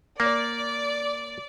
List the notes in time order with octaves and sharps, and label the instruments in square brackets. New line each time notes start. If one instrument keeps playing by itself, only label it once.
[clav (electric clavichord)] A#3 [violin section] D5